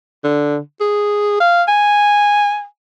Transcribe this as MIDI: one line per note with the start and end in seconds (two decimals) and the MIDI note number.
0.24 0.59 50
0.81 1.40 68
1.40 1.63 77
1.68 2.65 80